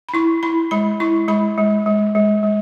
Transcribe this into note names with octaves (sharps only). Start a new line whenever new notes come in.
B5
E4 C#6
E4 B5
G#3 B5
E4 C#6
G#3 B5
G#3
G#3
G#3
G#3